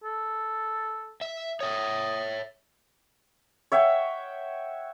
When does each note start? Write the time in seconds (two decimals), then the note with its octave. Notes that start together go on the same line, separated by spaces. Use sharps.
0.04 A4
1.21 E5
1.61 C#5 E5 D#6
3.72 C#5 E5 F#5 G5